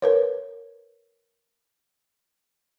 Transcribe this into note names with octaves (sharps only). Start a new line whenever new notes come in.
A#4 B4 C#5